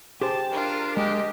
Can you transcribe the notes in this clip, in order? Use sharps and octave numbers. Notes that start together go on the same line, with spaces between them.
G4 G#4 C5 G5 A5
D4 F4 A#4
G#3 G4 D#5